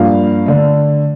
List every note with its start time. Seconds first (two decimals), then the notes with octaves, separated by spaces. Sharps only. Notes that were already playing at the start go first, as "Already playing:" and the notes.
Already playing: G2 F3 A#3 D4 F5
0.46 D3 A3 D4